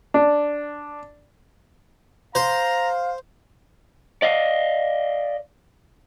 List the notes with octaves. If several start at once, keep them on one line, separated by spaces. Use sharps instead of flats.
D4
C5 F5 A#5
D5 D#5 F5